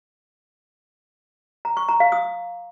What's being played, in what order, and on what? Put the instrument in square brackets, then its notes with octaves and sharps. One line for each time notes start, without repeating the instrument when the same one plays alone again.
[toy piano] A#5
C#6
A#5
F5
D#6